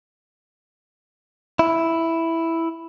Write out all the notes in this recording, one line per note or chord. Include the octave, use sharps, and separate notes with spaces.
E4